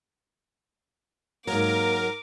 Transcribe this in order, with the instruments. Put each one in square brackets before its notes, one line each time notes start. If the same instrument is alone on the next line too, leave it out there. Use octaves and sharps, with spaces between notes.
[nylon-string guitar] G#2 F#3 [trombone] A#3 [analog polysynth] A#4 [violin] D6